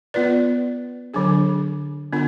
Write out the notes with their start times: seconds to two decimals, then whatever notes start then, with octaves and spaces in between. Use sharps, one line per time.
0.14 B3 F4 B4 D5
1.14 D3 F#3 D4 G#4
2.13 D3 B3 D4 F4